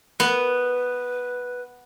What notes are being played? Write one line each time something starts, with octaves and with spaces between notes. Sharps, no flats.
B3 B4